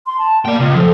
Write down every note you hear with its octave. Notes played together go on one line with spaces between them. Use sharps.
C6
A5
A#3 D5 G5
C#2 F4
F3 A4